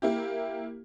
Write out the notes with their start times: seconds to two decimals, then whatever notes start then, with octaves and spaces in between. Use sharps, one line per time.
0.02 A#3 E4 G4